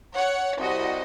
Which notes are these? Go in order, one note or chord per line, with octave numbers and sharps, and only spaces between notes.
C#5 F#5
C2 F#4 D#5